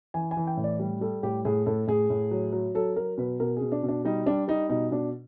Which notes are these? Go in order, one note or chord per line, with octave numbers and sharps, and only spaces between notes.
E3 G#5
G#5
E3
G5
A2
D5
G3
G3 A4
A2 G4
A2 G#4
A2 A4
A2 G#4
A2
F#3
F#3
F#3 A4
F#3 A#4
B2 B4
B2 A#4
B2 G#4
D4
B2
D4
G3 D#4
G3 D4
G3 D#4
B2 D#4
B2 D4